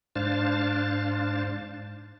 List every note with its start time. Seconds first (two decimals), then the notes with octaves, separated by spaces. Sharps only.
0.16 G#2 D4 C5 F5 A6